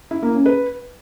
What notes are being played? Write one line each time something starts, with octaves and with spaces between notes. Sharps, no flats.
E4
A#3
C#4
B4